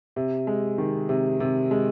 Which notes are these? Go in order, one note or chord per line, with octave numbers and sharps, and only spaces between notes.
C3
G#3
D#3
C3
C3
G#3